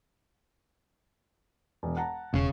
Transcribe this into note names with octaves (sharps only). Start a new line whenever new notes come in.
E1
F#5 A5 A#5
E1 C#3 C#4